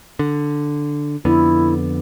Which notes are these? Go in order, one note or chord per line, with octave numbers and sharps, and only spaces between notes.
D3
F2 D3 B3 E4